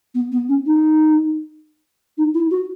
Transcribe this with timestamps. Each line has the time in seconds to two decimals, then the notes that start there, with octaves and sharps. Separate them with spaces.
0.14 B3
0.31 B3
0.48 C#4
0.66 D#4
2.17 D#4
2.34 E4
2.50 F#4